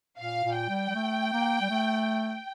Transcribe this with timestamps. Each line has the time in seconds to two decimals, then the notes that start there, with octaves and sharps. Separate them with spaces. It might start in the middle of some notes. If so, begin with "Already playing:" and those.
0.19 A#2 F5
0.44 A#2
0.56 G5
0.69 G3
0.89 G3
0.95 A3
1.33 A#3
1.61 G3
1.70 A3